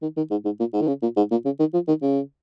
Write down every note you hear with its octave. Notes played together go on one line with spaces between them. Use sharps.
D#3
D#3
G#2
G#2
A#2
G#2
D#3
C#3
A#2
G#2
A#2
C#3
D#3
F3
D#3
C#3